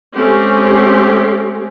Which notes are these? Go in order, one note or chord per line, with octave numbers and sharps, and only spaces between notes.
G#3 A3 C4 C#4 G4